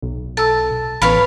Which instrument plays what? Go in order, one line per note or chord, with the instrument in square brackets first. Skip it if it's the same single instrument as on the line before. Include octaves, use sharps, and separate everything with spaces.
[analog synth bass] B1
[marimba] A4 E6 [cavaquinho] A5
[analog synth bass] A1 [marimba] B3 B4 [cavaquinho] C#5 F5 B5